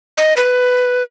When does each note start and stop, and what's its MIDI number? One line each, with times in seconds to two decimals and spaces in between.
0.18 0.34 75
0.37 1.03 71